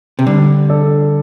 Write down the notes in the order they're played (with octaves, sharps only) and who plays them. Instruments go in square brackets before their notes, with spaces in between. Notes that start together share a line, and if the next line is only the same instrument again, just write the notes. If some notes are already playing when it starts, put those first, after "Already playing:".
[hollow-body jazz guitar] C3
[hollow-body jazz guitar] D3 [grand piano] G3
[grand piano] D4 A4 D5